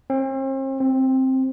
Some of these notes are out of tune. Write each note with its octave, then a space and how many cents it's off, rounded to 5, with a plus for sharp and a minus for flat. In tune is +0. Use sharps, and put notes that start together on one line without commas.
C4 +40
C4 +5